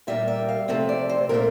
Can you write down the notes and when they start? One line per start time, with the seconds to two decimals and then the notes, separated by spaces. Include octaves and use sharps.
0.07 A#2 G3 A#3 E5
0.28 E5
0.49 F5
0.68 C3 F3 A3 C4 E5
0.89 D5
1.09 C5
1.29 A#2 A3 C4 A#4